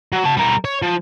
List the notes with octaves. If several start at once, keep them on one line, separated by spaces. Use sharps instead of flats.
F#3
F#4 A5
G3 A#4
C#5
F3